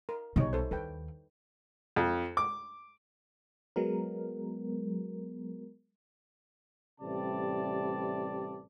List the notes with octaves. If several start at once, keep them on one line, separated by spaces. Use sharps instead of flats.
A#4
B1 B2 G3 D#4 C#5
A4 C5
D#2 A4 B4 G5
F2
D6
F#3 G#3 B3 A#4
A1 C3 G3 D5 A5